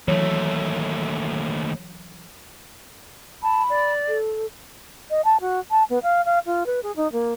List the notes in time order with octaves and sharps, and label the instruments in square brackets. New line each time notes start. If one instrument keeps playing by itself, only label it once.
[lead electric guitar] D#2 A3 [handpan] E3 F#3 C#5
[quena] A5 [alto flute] B5
[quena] D5
[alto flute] A4
D#5
A5
F#4
A5
B3
F5
F5
F4
B4
G#4
D#4
A#3